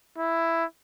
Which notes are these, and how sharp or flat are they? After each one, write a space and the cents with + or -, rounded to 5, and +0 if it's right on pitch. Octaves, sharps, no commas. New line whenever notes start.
E4 +5